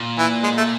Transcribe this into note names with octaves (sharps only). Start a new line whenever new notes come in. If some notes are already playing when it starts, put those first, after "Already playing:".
Already playing: A#2
E3
G#3
A3